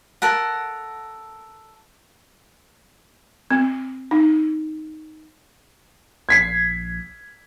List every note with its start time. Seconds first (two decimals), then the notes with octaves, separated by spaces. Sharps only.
0.22 A4 A#4 F#5
3.51 C4
4.11 D#4
6.29 A#1 G#6 B6 C7